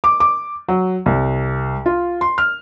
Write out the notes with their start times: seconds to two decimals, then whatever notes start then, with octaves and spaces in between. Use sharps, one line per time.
0.04 D6
0.20 D6
0.69 F#3
1.06 C2
1.86 F4
2.21 C6
2.38 F6